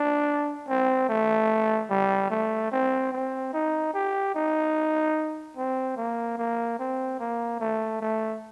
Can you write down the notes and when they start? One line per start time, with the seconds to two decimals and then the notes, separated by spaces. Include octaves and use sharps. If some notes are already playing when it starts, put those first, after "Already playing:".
Already playing: D4
0.68 C4
1.09 A3
1.90 G3
2.31 A3
2.72 C4
3.13 C4
3.53 D#4
3.94 G4
4.35 D#4
5.57 C4
5.97 A#3
6.38 A#3
6.79 C4
7.19 A#3
7.60 A3
8.01 A3